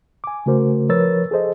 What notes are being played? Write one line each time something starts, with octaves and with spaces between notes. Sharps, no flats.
G#5 D6
C#3 A3 F#4 A#4 C5
F3 A#4 B4 C#5 E6 A6
G#4 A4 C5 D#5